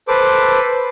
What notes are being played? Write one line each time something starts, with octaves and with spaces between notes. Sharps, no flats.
A4 B4 C5 D6